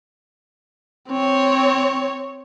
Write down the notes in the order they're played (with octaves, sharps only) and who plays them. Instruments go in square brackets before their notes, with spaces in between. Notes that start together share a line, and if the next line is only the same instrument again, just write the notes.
[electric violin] C4 C#5